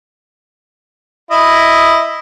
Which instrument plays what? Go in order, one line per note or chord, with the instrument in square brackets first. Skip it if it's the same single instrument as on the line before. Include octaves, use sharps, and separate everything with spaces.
[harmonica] E4 D#5